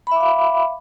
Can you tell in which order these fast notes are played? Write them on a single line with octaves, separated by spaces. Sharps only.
B5 E5 D6 F5